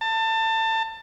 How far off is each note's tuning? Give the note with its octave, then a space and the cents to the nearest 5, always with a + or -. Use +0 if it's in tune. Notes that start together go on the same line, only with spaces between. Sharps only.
A5 +25